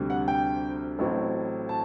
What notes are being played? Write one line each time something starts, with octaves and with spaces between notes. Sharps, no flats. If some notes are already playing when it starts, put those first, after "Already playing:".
Already playing: D2 C3 G3
F#5
G5
A1 A2 F#3 C4
A5